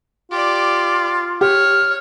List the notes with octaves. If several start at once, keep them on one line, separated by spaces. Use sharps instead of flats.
F4 G4 D5
G4 C#5 F6